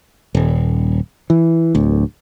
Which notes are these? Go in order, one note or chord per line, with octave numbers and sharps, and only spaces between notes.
D#1
E3
D1 D2